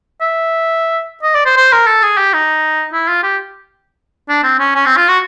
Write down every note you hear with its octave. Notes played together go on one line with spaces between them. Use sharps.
E5
D#5
D5
C5
C5
A#4
A4
G#4
G4
D#4
E4
F4
G4
D4
C4
C#4
C#4
C4
F4
F#4